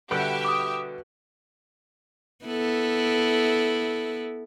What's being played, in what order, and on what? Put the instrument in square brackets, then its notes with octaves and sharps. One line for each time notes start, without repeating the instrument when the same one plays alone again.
[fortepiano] D3 G3 F#5 [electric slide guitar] F#4 B4 [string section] G4 E5
[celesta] D6 D#6
[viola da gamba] B3 E4 A4